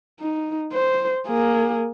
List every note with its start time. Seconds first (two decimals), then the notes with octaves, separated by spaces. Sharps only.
0.21 D#4
0.73 C5
1.27 A#3 G#4